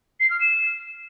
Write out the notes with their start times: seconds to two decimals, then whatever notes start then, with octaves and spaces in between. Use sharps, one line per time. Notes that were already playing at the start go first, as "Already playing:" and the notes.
0.20 C7
0.30 F6
0.41 E7